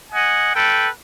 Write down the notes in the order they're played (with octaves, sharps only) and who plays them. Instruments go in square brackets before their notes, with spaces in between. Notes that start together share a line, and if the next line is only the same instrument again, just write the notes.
[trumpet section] D#5 F#5 G#5
A4 B4 G5